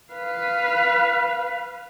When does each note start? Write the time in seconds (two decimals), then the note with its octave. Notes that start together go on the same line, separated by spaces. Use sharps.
0.13 B4 F5